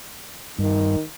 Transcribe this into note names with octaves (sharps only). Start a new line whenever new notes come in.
G2 D#3